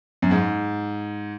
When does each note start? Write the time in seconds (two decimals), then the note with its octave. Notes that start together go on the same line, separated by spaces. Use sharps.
0.22 F#2
0.31 G#2